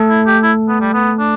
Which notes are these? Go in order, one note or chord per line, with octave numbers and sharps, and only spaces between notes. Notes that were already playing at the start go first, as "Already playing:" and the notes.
Already playing: A3 A4
E4
G4
E4
B3
G3
B3
D4